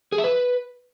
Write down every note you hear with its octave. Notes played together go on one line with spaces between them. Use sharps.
G#4
E5
B4